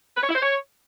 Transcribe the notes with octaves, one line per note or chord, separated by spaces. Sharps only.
B4
C#5
E4
C5
C#5